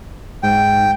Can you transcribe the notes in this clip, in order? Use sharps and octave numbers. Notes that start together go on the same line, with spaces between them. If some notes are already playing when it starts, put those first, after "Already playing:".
G#2 G5